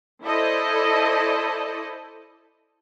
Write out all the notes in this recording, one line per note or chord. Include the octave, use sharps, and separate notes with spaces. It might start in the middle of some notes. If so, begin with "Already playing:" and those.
E4 A4 C5 D5 D#5